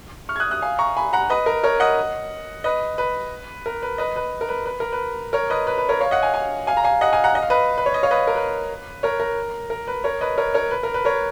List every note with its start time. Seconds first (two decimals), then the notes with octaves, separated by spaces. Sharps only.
0.29 C#6 F6
0.36 G#6
0.40 D#6 F#6
0.51 D#6 F#6
0.62 F5 G#5
0.79 A#5 C#6
0.97 G#5 B5
1.13 F#5 A#5
1.30 B4 D#5
1.46 A#4
1.64 A#4 C#5
1.80 D#5 F#5
2.64 B4 D#5
2.98 B4
3.66 A#4
3.83 B4
3.98 B4 D#5
4.16 B4
4.41 A#4
4.49 B4
4.66 B4
4.80 A#4
4.92 B4
5.33 A#4 C#5
5.50 B4 D#5
5.67 B4
5.78 B4
5.89 A#4 C#5
6.00 C#5 F5
6.11 D#5 F#5
6.23 F5 G#5
6.34 F5 G#5
6.67 F5 G#5
6.77 A#5
6.84 F5 G#5
7.01 D#5 F#5
7.13 F5 G#5
7.24 F#5 A#5
7.35 D#5
7.42 F5
7.50 B4 D#5
7.78 B4
7.86 C#5
7.94 D#5
8.03 C#5 F5
8.11 B4 D#5
8.27 A#4
8.35 B4
9.03 A#4 C#5
9.20 A#4
9.70 A#4
9.88 B4
10.04 A#4 C#5
10.21 B4 D#5
10.38 A#4 C#5
10.54 A#4 C#5
10.71 B4
10.83 A#4
10.94 B4
11.05 A#4 C#5